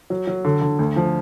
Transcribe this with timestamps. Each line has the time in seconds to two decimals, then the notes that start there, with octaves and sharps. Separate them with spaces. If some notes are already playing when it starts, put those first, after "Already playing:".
0.10 F#3
0.27 F#3
0.44 D3
0.61 D3
0.79 D2
0.96 F3